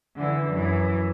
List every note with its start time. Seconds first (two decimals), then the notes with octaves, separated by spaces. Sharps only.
0.15 D3 E3
0.49 F#2 E3